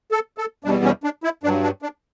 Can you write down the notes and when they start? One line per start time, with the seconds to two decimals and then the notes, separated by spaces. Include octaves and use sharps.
0.12 A4
0.38 A4
0.64 E2 B2 G3 D4
0.84 C#4
1.04 D4
1.23 E4
1.43 G2 F#3 D4
1.63 D4
1.82 D4